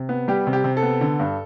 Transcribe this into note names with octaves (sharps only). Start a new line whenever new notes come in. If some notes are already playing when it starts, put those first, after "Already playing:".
Already playing: C3
B3
G3 G4
C3
G4
C3
A4
B3
D3
G2